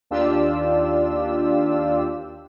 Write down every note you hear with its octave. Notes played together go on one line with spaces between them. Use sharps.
D#2 D4 F4 G4 E6